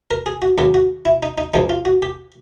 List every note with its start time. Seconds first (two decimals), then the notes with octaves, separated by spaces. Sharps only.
0.11 A#4
0.26 G#4
0.42 F#4
0.58 D#2 C#3 F#3 G4
0.74 F#4
1.05 E4
1.23 D#4
1.38 D#4
1.54 C#2 C#3 F3 D#4
1.70 F4
1.85 F#4
2.02 G4